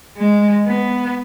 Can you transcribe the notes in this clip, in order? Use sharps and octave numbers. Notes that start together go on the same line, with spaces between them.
G#3
B3